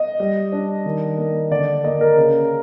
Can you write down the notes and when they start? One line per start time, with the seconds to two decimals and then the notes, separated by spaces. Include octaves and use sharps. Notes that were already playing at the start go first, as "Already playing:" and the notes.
Already playing: D#5
0.20 G3
0.52 D4
0.86 D#3
1.18 A#3
1.51 D3 D5
1.84 A#3 D#5
2.01 A#4
2.17 C#3